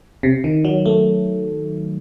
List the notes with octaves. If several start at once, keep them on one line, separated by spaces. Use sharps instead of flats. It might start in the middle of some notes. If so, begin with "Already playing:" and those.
C3
D#3
F#3
A3